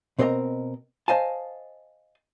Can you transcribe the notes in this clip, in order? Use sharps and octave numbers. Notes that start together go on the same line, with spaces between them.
B2 C4 A#4 D5 D#5 A#5
C5 D#5 F5 G#5 A5